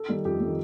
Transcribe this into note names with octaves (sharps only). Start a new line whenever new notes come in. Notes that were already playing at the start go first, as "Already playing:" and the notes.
Already playing: A4
D#3 G3
F2 G4
G3
D#3